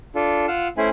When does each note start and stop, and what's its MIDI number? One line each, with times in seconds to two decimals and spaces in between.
0.15 0.46 62
0.15 0.46 65
0.15 0.46 69
0.48 0.68 65
0.48 0.68 77
0.48 0.68 78
0.48 0.68 88
0.78 0.89 57
0.78 0.89 61
0.78 0.89 64
0.78 0.89 72
0.78 0.89 80
0.78 0.89 83